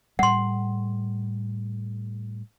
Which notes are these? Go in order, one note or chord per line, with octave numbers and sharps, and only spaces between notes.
A2 G3 F#5 C6